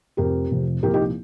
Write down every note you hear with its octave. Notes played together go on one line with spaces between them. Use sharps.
F1 F2 C3 G4 A#4
F1 F2 C3
C2 A#2 F3 G4 A#4
D#4 G4